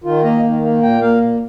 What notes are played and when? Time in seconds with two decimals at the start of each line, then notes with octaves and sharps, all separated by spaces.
0.04 D#3 F4
0.23 A#3 D#5
0.43 D#3
0.63 A#3
0.82 A#2 G5
1.01 A#3 F5
1.20 A#2